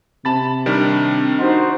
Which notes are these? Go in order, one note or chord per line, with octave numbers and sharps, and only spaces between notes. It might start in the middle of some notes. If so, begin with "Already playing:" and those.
C3 A5 B5 A6
D#3 G3 D4
D#4 F#4 C5